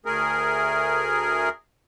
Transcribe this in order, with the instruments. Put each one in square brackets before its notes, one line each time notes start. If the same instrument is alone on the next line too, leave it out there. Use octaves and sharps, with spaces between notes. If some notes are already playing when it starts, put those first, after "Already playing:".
[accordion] D2 A3 G#4 A#4